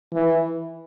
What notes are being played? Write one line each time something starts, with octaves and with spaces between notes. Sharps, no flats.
E3